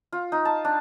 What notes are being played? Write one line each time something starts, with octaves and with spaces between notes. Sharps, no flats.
F4
D#4
A5
D4